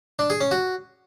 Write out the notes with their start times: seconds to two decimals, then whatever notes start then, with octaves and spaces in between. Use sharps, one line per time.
0.19 D4
0.30 G#4
0.41 C#4
0.51 F#4